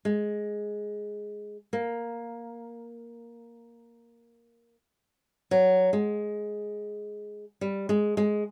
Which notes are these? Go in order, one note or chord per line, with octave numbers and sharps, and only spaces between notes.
G#3
A#3
F#3
G#3
G3
G#3
G#3